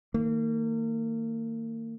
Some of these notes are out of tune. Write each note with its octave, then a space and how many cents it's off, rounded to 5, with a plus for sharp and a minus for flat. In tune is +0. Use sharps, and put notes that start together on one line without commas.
D#3 +25 A#3 -35